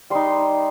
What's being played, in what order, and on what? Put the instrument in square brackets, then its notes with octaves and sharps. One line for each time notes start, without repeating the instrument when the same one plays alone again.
[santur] G3 D#4 C6